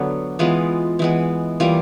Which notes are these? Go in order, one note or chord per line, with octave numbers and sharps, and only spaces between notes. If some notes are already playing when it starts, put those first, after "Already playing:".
Already playing: D3 F#3 B3
E3 G#3 B3 F4
E3 G#3 B3
E3 G3 A#3 F4